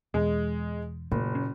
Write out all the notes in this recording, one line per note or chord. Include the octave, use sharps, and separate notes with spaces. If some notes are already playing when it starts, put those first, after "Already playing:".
E2 B2 G#3
F#1 A#2
C#4